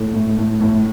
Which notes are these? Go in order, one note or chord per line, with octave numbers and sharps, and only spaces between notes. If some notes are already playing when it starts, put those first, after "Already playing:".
Already playing: A2 A3
A2
A2
A2